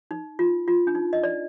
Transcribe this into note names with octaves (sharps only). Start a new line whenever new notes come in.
D#4
F4
F4
D4
D#4
D#5
D5